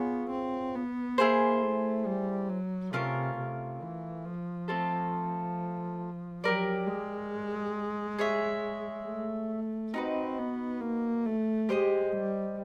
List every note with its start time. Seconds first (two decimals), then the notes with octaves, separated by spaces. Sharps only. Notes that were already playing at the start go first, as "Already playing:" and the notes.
Already playing: B3 F4 G#4 C#5 F#5
0.30 C4
0.75 B3
1.18 A#3 E4 G#4 C5
1.62 A3
2.06 G3
2.49 F#3
2.93 C3 A3 C#4 F4 A#4
3.38 C3
3.81 E3
4.25 F3
4.68 A3 C4 F4 A4
6.43 F#3 G4 A#4 D5
6.87 G#3
8.19 G#4 C#5 E5
9.06 A3
9.94 C4 D#4 F#4 B4
10.38 B3
10.81 A#3
11.26 A3
11.69 G#3 G4 C5 D#5
12.12 G3